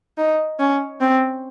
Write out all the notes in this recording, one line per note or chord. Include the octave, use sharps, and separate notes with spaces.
D#4
C#4
C4